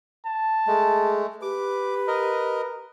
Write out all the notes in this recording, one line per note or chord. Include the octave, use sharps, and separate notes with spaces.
A5
G#3 A3 G#4
G4 B4 D6
A#4 D#5